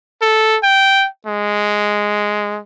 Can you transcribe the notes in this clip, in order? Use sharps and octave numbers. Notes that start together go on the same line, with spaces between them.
A4
G5
G#3